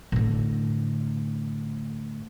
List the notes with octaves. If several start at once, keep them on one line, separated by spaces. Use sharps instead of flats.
A2 D3